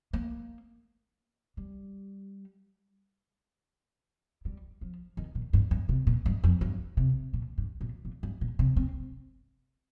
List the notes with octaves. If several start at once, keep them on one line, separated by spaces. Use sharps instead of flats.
A#3
G3
G3
F3
D#3
A#2
G2
G2
C3
A#2
G2
F2
G2
C3
A#2
G2
A#2
A#2
G2
A#2
C3
C4